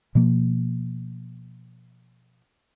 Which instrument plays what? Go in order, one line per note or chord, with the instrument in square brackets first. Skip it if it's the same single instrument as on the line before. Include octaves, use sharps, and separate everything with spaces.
[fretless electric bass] B2 F3 A#3